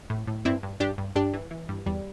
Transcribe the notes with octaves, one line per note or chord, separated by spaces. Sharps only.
A2
A2
G2 C4 E4
G2
G2 D4 G4
G2
G2 D4 G4
E3
E3
G2
E2 G3